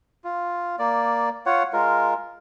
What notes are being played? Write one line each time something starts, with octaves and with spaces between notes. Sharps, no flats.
F4
A#3 D5
F4 C#5 F#5
G#3 F4 A#4